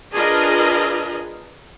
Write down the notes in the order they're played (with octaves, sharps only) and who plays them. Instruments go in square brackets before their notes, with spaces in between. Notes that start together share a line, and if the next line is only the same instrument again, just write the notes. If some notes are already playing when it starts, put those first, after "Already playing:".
[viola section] D4 F4 G#4 A#4 B4 D#5